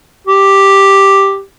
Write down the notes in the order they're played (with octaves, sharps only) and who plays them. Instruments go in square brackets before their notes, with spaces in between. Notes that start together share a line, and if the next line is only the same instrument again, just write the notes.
[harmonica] G4